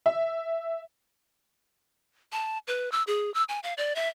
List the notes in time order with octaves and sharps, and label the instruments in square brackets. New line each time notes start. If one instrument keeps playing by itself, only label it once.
[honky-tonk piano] E5
[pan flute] A5
B4
E6
G#4
E6
G#5
F5
D5
E5